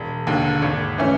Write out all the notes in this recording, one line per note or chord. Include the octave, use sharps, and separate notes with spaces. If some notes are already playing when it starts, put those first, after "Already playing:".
Already playing: E1
D#2 D3
G#1
E3 A3 C#4